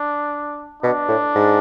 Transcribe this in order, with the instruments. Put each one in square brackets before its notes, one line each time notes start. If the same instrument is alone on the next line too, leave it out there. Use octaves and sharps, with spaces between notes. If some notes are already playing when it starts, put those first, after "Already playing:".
Already playing: [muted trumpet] D4
[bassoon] B2 [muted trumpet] D4
[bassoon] A2
G#2